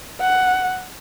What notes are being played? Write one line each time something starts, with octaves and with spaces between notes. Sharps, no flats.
F#5